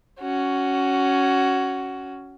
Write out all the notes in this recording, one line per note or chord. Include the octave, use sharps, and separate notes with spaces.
C#4 F#4